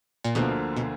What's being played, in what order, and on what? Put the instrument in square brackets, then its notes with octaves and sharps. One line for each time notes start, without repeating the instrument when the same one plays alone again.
[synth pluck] A#2
[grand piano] D2 D3 F3 A#3 F4 [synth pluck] B2
[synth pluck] B2